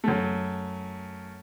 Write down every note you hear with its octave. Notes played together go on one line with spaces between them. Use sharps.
F#2 A3